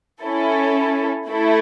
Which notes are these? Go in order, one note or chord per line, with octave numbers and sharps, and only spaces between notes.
C#4 E4 A4
A3 E4 A4